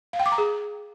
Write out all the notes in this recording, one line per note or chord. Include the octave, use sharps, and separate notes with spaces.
F5
G5
D6
A#5
G#4